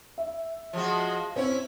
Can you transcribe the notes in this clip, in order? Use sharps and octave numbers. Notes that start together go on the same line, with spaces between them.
E5
F3 G#3 F#4
C4 C#4 E4 C#5